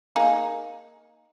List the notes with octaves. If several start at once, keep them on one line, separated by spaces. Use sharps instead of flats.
A#3 D#4 G#4